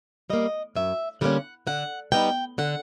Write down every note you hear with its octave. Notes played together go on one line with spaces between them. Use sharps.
G3 A#3 D#5
F#2 E5
D3 G3 A#3 C#4 F#5
D3 F#5
G3 B3 D#4 G5
D3 F#5